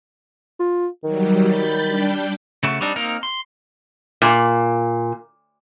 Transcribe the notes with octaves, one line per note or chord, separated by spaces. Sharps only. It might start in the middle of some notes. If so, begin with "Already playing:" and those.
F4
D#3 F#3 G3
B5 G6 A6
G3 D4 G4
C#3 A3 F#4
G3 C4 D4 D#4
A#3 C4 D#4 A#4
C6
A#2